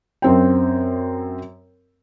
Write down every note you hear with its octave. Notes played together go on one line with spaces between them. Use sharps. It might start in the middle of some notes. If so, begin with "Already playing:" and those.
F#2 C4 G5